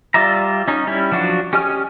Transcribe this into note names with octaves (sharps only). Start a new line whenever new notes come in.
G3 F4 D5 E5 A#5
C#4 D#4
G3 C#4 E4
F3 F#3 D4 F#4
C#4 G4 D#5 G#5 F6